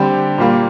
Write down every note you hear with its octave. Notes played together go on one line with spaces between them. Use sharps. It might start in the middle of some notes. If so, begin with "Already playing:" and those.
Already playing: D3 G3 C4 G4
A#2 G3 A#3